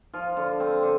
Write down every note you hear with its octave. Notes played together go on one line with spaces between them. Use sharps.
F3 F4
D3
C4
D3